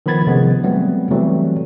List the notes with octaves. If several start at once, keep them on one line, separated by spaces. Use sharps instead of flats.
D#3 F3 B3 B5 G#6 A6
C3 D#3 F3 G#3 B3 C#4
F#3 G3 A3 B3 C4
E3 F#3 G3 A3 C4